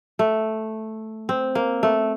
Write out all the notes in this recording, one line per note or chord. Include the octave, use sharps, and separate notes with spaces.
A3
C4
A#3
A3